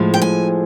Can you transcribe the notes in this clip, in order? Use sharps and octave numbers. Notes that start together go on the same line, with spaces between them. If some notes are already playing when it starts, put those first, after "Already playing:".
Already playing: A2 F3 G#3
G5
G#5